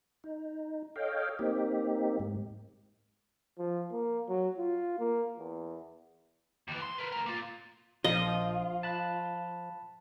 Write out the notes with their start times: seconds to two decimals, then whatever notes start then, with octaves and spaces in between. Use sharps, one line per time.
0.24 D#4
0.96 A4 C#5 D#5 F5 G5
1.39 A#3 C4 D#4 G4
2.19 G#2
3.59 F3
3.92 A#3
4.29 F#3
4.58 F4
4.99 A#3
5.38 E2
6.68 D#2 E3
6.82 C6
6.98 A#4 B4
7.12 A2 A#4
7.26 A#3 F4
8.04 A#1 F3 F4 D#5
8.83 A5 B5 F#6